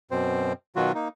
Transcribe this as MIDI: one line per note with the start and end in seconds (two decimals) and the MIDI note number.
0.11 0.53 42
0.11 0.53 47
0.11 0.53 60
0.11 0.53 72
0.76 0.92 47
0.76 0.92 51
0.76 0.92 54
0.76 0.92 65
0.76 0.92 66
0.95 1.08 58
0.95 1.08 63